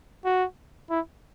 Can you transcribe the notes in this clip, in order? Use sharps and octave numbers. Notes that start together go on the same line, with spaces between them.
F#4
E4